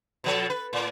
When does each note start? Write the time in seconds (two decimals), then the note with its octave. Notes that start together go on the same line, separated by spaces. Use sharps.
0.24 B2 F3 A4
0.50 B4
0.73 A2